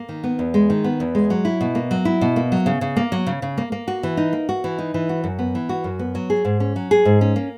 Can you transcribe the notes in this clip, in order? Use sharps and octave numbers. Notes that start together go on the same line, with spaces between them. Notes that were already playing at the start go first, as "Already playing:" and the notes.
Already playing: A#3
D#3
B3
E2
G#3
D#3
B3
E2
G#3
F#3
E4
B2
A#3
F#3
E4
B2
A#3
F#3
C#3
C#3
A#3
F#3
C#3
C#3
A#3
A#3
F#4
E3
D#4
A#3
F#4
E3
D#4
E3
F#4
F#2
B3
E3
F#4
F#2
B3
F#3
G#4
G#2
C#4
F#3
G#4
G#2
C#4
A#3